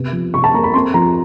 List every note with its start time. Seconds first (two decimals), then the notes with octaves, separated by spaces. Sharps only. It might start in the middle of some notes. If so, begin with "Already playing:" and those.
Already playing: C3 B3
0.13 F3
0.34 C3 C#6
0.44 A5
0.54 A#3 A#5
0.63 B5
0.74 C4 C6
0.94 F3 A#5